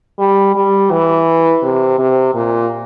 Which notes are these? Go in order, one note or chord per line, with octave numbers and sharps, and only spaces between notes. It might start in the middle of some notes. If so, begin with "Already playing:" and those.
G3
G3
E3
C3
C3
A#2